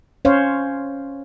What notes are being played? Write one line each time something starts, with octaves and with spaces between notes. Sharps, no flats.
C#4 C5 C#5 F5